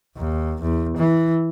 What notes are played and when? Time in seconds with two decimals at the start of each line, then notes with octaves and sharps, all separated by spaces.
0.17 D#2
0.62 E2
0.97 E3